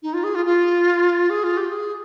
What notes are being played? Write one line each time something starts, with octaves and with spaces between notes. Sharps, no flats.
D#4
F4
G#4
F4
F4
G#4
F4
G4
G#4